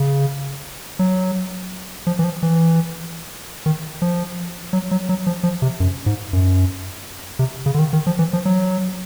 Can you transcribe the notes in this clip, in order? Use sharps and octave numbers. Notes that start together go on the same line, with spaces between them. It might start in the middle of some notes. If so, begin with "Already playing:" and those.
Already playing: C#3
F#3
F3
E3
F3
E3
D#3
F3
F#3
F#3
F#3
F3
F3
C3
F#2
G#2
F#2
C3
C#3
D3
D#3
D#3
F3
E3
F3
F#3